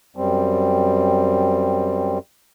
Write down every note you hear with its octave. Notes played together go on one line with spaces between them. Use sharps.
F#2 G3 C4